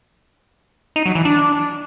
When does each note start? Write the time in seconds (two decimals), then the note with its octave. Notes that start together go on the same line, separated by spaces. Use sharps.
0.96 D#4
1.06 F#3
1.15 E3
1.25 D4